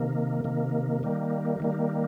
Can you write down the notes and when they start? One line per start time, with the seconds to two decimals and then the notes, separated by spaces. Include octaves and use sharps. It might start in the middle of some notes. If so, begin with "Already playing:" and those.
Already playing: C3 D#3 A#3
0.44 C3 D#3 A#3
1.03 D#3 G3 A#3
1.60 D#3 G3 A#3